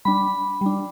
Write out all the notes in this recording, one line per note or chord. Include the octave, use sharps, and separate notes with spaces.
G3 D4 B5
G3 D4